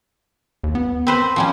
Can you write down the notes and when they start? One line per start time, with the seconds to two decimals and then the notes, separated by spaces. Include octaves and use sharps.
0.63 D#2
0.75 B3
1.07 C4 B4 C5
1.36 F3 G3 C#4